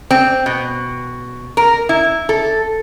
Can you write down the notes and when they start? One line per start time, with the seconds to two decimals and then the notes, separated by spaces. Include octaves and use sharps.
0.11 C4
0.46 B2
1.57 A#4
1.89 E4
2.29 A4